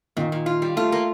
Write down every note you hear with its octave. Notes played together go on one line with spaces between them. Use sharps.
A#2 D#3 D#4
A#2
F4
G3
A3 F4 A4
A#3